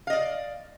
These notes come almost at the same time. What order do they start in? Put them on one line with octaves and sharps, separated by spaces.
F5 D#5 D5